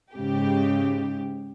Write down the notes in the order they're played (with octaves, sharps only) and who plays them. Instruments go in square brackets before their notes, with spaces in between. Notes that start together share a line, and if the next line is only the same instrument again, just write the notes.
[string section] G#2 C#3 G4